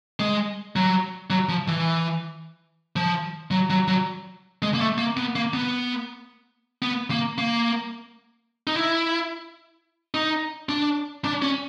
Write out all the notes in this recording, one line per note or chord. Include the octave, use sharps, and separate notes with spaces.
G#3
F#3
F#3
F3
E3
F3
F#3
F#3
F#3
G#3
A#3
A3
A#3
B3
A#3
B3
B3
A#3
A#3
D#4
E4
D#4
D4
D4
C#4